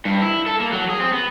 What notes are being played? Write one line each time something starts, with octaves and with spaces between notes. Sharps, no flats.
G2
E4
A4
A#3
F#3
G#4
C4
B3